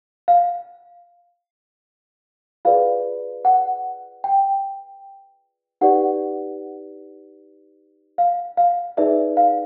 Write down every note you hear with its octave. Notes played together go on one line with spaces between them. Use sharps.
F5
F4 G#4 B4 D5 F5
F#5
G5
D#4 G4 B4 D5 F#5
F5
F5
D#4 G#4 B4 D5 E5
F5